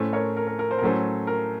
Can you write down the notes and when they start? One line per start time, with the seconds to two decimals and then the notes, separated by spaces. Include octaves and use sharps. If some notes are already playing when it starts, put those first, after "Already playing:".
Already playing: A2 A3 C#4 A4 C5
0.13 A#4 C#5
0.37 A#4
0.47 A#4
0.59 A#4
0.71 C5
0.78 A#4
0.82 A2 F#3 A3 C#4 A4 C5
1.27 A#4